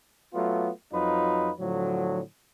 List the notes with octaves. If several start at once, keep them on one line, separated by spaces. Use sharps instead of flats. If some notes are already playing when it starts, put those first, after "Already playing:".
F#3 A3 B3 F4
F2 F#3 D#4 F4 B4
A2 D3 F3 F#3